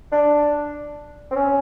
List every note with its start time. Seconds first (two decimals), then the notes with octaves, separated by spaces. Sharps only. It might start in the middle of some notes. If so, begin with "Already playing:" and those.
0.12 D4
1.31 C4
1.36 C#4